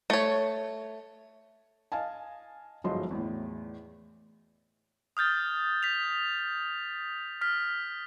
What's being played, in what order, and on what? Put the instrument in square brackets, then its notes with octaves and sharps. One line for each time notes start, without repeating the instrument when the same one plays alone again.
[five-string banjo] A3 C#5
[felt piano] D#5 F5 G#5 A5
G1 G#2 F3 F#3 D#5 C6
E2 A2
[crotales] D#6 F6 G6 A6
B6 F7
F6 B6